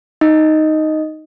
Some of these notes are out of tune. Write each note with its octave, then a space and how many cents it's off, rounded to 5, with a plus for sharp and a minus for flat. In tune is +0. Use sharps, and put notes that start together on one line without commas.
D#4 +0 D#5 +0